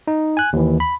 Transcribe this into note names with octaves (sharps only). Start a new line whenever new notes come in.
D#4
G#5 F#6
D#2 E3
B5